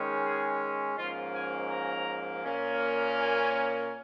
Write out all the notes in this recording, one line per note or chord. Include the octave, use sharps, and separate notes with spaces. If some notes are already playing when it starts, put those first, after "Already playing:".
Already playing: D#3 G#3 C#4
G#4
G#2 F3 A#3 C#4 F4
G#5
A#5
A#2 A#3 C#4
G#5